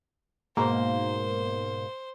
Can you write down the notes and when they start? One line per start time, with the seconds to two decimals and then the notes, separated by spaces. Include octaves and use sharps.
0.57 G#2 B2 A#3 C5